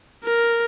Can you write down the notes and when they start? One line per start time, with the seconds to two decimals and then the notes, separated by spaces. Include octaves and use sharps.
0.24 A#4